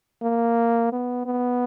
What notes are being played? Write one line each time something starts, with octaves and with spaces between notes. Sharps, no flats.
A#3
B3
B3